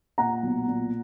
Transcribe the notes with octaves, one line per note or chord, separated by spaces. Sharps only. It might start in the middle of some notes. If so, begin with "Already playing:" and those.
A#2 F#5 A#5
B1
A#2